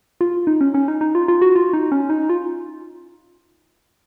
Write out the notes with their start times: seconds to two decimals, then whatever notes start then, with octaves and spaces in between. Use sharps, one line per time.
0.21 F4
0.47 D#4
0.61 C#4
0.74 C#4
0.88 D#4
1.01 D#4
1.15 F4
1.28 F4
1.42 F#4
1.56 F4
1.73 D#4
1.92 C#4
2.10 D#4
2.30 F4